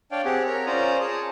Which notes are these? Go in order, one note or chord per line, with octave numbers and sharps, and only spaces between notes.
D4 C#5 D5 F5 G5
C4 G4 G#4 F#5
A#4 C#5 A#5
C#4 F4 C5 D5 A#5 D#6
G#4 C#5 A5 D#6